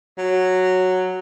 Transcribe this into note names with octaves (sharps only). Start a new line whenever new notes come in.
F#3